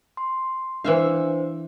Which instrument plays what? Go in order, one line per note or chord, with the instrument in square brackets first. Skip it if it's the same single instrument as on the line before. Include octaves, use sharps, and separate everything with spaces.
[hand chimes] C6
[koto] E3 E5 F5 [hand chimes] D4 C5